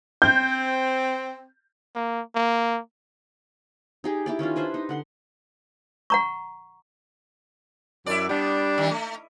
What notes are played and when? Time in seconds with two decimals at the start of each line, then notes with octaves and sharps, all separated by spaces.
0.22 C4 G6
1.95 A#3
2.35 A#3
4.04 D#4 G4 G#4
4.26 E4 G4 D5
4.39 D#3 C#4 E4 F4
4.56 D4 B4 C5 E5
4.74 D#4
4.89 D3 F#5 C6
6.10 F#5 A#5 C#6
8.06 F#2 E4 D5
8.29 G3 B3 D4
8.78 D#3 E3
8.91 A3